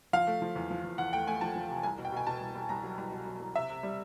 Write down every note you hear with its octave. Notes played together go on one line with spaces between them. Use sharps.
F3 F5
A3
F3
E2
F3
E2
E2 F#5
A3 G5
A3 G#5
F3 A5
F3
C3
C2 G#5
B2
G5
B2 G#5
B2 A5
C2
C2
C2 A#5
F#3
C2
B2
F#3
C2
C3 E5
C3
G3